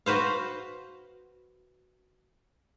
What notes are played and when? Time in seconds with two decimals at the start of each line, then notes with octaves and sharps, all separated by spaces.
0.06 F#4 B4 C5 F5